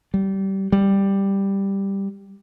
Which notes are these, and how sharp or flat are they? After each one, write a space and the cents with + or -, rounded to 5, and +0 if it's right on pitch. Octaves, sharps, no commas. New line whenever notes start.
G3 -20
G3 +5